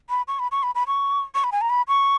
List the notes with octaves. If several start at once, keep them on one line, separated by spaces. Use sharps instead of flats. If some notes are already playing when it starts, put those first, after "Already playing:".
B5
C#6
B5
C#6
B5
B5
C#6
C#6
B5
G#5
A#5
B5
C#6